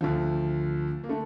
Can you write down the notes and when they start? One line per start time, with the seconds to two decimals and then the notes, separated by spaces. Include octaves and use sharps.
0.01 D2 D3 F3
1.04 A#3
1.09 D3 A3